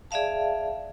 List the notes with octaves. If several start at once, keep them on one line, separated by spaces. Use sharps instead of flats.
G#4 D5 E5 F5 A5